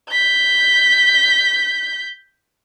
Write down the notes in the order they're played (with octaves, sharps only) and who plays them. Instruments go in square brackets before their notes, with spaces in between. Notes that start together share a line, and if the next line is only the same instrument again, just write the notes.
[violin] G6 B6